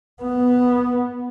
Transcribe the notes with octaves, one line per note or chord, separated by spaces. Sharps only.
B3